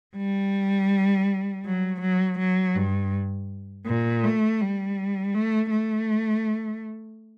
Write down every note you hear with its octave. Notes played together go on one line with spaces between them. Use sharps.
G3
F#3
F#3
F#3
G2
A#2
A3
G3
A3
A3